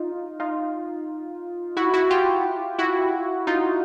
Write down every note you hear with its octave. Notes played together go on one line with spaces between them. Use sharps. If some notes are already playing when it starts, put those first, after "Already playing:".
Already playing: D#4 F4
D#4 F4
E4 F#4
E4 F#4
F4 G4
E4 F#4
D#4 F4